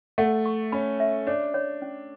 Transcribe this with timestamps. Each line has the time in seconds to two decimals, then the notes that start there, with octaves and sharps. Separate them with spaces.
0.18 A3 F#5
0.46 C#6
0.72 C#4 B5
1.00 E5
1.27 D4 C#5
1.54 C#5
1.82 C#4